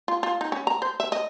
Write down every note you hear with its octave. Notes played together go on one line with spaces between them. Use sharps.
F4
F4
D#4
C#4
A#5
C5
E5
D#5